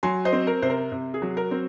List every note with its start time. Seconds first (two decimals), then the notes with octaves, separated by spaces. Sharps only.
0.03 F#3 G#5 C6
0.25 C5 D#5
0.33 C4
0.47 A#4
0.62 C3 C5
0.70 A#4
0.92 C3
1.14 G#4
1.22 F#3
1.37 A#4
1.51 C4